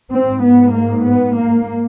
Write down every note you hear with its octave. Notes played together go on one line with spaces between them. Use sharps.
G#2 C4
B3
A#3
B3
A#3